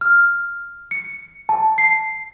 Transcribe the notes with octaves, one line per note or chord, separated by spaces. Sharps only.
F6
C#7
A5
C7